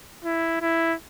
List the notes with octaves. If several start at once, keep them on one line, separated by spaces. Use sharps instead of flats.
E4
E4